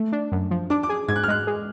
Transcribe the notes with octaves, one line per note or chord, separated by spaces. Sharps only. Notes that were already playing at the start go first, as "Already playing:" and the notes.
Already playing: A3
D4
F#2
F3
D4 D6
D6
G#4
G#2 G#6
F#6
F6
G#3 F#6
G#3